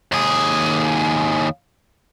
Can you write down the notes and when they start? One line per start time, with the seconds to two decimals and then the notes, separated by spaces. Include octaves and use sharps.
0.12 D#2 G#4